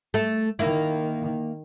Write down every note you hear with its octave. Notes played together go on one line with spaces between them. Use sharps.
A3 A4
D#3 A#3 E4